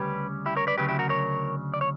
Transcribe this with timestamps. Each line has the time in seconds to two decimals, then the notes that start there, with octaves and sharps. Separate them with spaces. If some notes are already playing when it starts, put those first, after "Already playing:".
Already playing: D2 C#3 G3 C#4 G4 B4
0.46 E4 G4
0.56 A#4 C#5
0.67 B4 D5
0.78 D2 C#3 F#3 G4 B4
0.89 E4 G4
0.99 F#4 A#4
1.09 A#4 C#5
1.74 D5
1.81 C#5